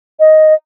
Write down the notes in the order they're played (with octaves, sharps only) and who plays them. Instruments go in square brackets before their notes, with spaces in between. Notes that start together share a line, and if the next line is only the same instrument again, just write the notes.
[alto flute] D#5